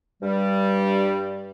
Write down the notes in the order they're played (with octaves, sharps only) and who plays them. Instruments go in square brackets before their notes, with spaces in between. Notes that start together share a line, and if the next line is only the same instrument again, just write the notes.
[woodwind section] G2 G3